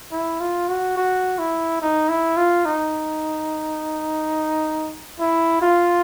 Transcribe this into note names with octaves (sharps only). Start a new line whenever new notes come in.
E4
F4
F#4
F#4
E4
D#4
E4
F4
D#4
E4
F4